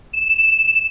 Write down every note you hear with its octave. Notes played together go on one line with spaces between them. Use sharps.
E7